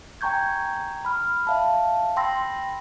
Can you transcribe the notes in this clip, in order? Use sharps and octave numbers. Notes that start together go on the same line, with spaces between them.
G5 G#5 A#5 C#6 G6 G#6
B5 F6
E5 F5 A5
G5 B5 C6 E6 A#6